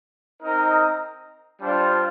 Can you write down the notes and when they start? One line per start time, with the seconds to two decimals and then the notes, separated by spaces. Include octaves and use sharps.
0.41 C4 D#4 A#4 D#5
1.61 G3 D4 F4 C5